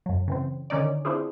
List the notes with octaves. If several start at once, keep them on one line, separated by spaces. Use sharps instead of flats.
F#2 F#3
C#3 E3 C4
D3 D#3 C#4 D#4 D5
C4 D4 E4 F4 G#4